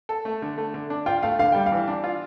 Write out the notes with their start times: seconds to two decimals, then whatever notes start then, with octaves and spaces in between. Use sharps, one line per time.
0.09 A4
0.25 A3
0.42 D3
0.58 A3
0.74 D3
0.90 D4
1.06 F4 G5
1.23 A3 F5
1.39 D3 F5
1.52 G3 G5
1.66 F5
1.72 E3
1.88 D4
2.04 F4